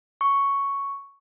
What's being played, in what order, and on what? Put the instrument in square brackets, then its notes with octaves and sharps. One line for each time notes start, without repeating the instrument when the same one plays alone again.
[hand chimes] C#6